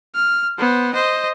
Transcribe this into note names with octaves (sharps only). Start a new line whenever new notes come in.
F6
B3 C5
C5 D#5